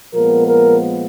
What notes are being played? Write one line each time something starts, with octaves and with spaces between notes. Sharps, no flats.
A#2 F3 G#3 B3 A#4
A#4